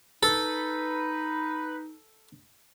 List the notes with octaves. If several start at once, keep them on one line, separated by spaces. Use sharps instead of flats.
D#4 A4 B4